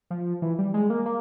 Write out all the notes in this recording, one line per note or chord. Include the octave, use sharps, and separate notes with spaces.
F3
E3
G3
G#3
A#3
A#3